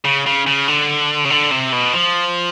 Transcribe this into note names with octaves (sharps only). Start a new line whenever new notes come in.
C#3
C#3
C#3
D3
C#3
D3
C3
B2
F3